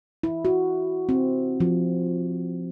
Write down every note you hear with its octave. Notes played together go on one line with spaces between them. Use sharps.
E4
F#4
C4
F3